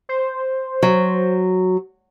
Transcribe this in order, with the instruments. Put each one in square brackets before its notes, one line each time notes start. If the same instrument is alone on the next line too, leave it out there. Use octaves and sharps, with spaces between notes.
[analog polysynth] C5
[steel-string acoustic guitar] F#3